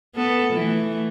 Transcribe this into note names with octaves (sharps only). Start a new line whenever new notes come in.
B3 A4
E3 A3